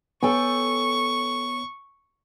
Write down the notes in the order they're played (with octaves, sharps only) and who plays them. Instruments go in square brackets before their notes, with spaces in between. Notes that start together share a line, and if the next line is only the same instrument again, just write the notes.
[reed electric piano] B3 C#5 [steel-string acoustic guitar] A4 G5 G#5 [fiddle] C#6